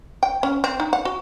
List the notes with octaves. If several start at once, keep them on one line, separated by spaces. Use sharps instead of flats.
G5
C#4
C4
D#4
F#5
F#4